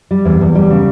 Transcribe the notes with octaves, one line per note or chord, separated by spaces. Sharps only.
G3
E2
E2
G3
C#3